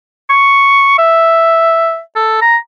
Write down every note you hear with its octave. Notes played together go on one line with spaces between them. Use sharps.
C#6
E5
A4
A#5